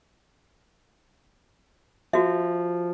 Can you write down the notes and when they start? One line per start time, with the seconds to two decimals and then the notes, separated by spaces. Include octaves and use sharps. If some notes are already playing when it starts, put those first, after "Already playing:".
2.13 F3 F#4 E5